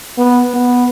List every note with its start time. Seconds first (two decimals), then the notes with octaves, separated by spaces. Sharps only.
0.18 B3
0.54 B3